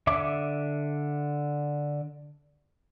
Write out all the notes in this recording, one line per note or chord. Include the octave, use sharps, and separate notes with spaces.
D3 E5 D6